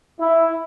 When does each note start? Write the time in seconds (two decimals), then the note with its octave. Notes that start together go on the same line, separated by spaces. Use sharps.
0.21 E4